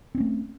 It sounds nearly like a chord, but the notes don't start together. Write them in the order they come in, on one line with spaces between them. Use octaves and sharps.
C4 C#4 A3